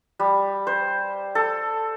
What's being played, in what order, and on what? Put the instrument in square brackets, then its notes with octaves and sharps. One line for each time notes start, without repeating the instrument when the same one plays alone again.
[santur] G3
C5
A4